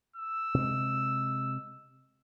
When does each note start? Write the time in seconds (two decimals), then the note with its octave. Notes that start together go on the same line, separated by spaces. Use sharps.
0.16 E6
0.54 C3 G#3